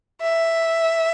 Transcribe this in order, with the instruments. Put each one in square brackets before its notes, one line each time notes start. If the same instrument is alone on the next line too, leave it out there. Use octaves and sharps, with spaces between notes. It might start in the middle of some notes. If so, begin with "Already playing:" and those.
[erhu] E5